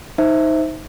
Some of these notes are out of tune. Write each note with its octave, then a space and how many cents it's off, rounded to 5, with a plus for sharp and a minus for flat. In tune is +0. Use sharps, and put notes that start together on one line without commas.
D#4 +10 C5 +0 E5 +0